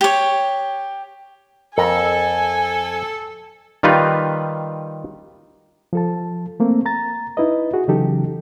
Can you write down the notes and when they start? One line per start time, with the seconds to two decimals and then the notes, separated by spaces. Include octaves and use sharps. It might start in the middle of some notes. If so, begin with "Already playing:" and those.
0.01 G4 C#5
1.78 F2 A4 A#4 G#5 A#5
3.83 D#3 G3 D#4 F4 B4
5.93 F3 A4 A5
6.60 A3 A#3 C4
6.86 A#5 A6
7.37 D#4 E4 B4 D#5
7.74 F#4 G#4
7.88 C#3 E3 F#3 D#4 G4 A4